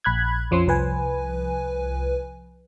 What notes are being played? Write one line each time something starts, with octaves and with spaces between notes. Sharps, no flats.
A#1 B5 F#6 G#6
F2 F3 C#4 C6
C2 F3 B4 G#5